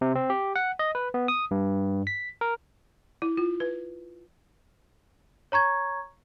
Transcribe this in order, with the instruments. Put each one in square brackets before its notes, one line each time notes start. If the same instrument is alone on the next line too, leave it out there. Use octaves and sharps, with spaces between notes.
[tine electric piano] C3
C4
G4
F#5
D#5
B4
B3
D#6
G2
B6
A#4
[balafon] E4
F4
B4
[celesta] C#5 A#5 C#6 G#6